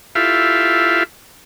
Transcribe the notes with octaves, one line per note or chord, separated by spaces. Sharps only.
E4 F4 G4 A4 E5 F5